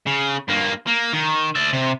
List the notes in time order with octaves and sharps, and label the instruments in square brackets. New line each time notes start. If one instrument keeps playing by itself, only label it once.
[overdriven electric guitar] C#3
G2 A#3
A#3
D#3
D5 E5
C3